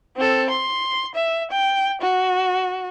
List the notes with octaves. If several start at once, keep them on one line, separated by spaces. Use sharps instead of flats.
C4 A4
C6
E5
G5
F#4